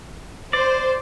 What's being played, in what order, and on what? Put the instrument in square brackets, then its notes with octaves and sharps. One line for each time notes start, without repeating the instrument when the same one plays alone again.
[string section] C5 [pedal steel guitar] D5